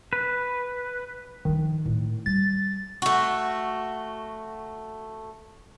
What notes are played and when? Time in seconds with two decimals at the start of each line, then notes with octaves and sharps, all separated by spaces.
0.13 B4
1.45 D#3 F3 D4
1.86 A2 D#4
2.26 G3 A6
3.02 A3 F#4